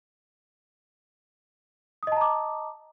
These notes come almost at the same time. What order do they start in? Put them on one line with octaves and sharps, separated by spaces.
D#6 D#5 A5 A#5 D6